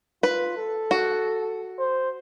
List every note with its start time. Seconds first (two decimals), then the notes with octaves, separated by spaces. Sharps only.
0.23 F4 B4
0.57 A4
0.91 F#4
1.79 C5